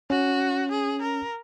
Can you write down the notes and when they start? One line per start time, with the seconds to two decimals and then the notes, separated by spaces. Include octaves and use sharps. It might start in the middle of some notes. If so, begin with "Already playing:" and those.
0.10 C#4 F#4
0.71 G#4
1.02 A#4